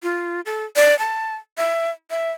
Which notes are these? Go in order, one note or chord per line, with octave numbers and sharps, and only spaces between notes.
F4
A4
D5
A5
E5
E5